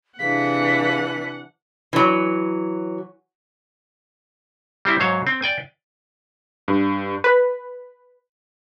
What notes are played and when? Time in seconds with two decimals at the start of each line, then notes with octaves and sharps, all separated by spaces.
0.19 C3 E3 D4 G#4 F5 F#5 B6
1.93 E3 F#3
4.85 G3 C4 E4
5.00 G#2 F#3 C5 C#5 F5
5.27 C4
5.42 D5 G5 G#5
6.68 G2
7.24 B4